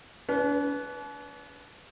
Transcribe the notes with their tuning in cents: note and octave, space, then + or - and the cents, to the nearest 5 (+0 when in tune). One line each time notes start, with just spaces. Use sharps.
D4 -45 B4 +0